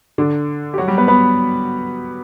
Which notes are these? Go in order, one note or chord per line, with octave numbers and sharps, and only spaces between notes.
D3 D4
G4
F#3 F#4
G3 G4
B3 B4
B3 B4